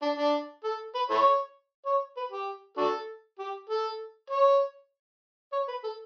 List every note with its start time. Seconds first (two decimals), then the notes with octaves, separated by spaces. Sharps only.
0.02 D4
0.18 D4
0.64 A4
0.95 B4
1.10 E4 A4 C#5
1.86 C#5
2.17 B4
2.32 G4
2.77 D4 F#4 A4
3.39 G4
3.70 A4
4.30 C#5
5.53 C#5
5.68 B4
5.84 A4